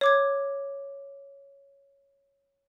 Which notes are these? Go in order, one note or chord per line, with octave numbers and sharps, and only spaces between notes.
C#5 D6 G#6